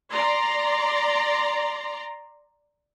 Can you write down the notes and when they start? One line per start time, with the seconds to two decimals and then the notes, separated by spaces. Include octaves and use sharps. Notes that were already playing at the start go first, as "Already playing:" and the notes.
0.13 D5 A#5 C6